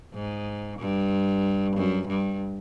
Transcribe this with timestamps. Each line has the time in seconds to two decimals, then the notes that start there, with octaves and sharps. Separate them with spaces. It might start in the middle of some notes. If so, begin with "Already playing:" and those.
0.15 G#2
0.79 G2
1.76 F#2
2.08 G2